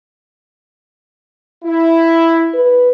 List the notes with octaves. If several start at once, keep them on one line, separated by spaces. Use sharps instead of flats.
E4
B4